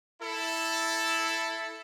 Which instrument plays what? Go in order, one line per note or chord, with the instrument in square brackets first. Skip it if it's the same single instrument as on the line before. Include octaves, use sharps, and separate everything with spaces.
[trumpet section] E4 A4